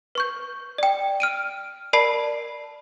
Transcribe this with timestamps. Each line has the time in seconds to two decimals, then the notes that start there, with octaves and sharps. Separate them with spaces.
0.15 B4 C#6 G6
0.78 D5 G5
1.20 F6 D7 D#7
1.93 A#4 D5 A5 B5 C7 D7